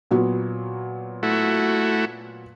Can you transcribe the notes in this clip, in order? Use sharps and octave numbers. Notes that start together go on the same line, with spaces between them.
A#2 F#3 B3
A3 E4 F#4